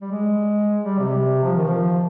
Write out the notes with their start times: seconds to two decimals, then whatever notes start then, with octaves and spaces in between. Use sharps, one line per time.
0.02 G3
0.11 G#3
0.84 G3
0.99 C3
1.44 F3
1.57 D#3
1.69 F3